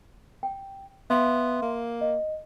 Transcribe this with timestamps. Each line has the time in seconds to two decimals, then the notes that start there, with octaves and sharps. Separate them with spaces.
0.43 G5
1.10 B3 E5 F5 C6
1.62 A#3
2.01 D#5